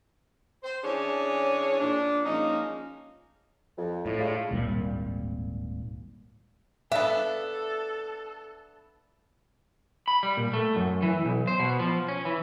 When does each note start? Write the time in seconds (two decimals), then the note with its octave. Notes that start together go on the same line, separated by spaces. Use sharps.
0.63 C5
0.83 E3 C#4 D4 G#4 C#5
1.80 A#2 D4
2.24 F3 G#3 A#3 C#4 D#4
3.78 F2
4.06 A2
4.20 G#3 D4 F4
4.51 D1 G#1 A#2 G3
6.92 B3 D4 A4 E5
10.08 B5
10.23 G3
10.37 A#2
10.53 A3
10.76 F#2
11.02 E3
11.25 B1
11.47 C5
11.60 B2
11.79 F3
12.08 C#4
12.25 E3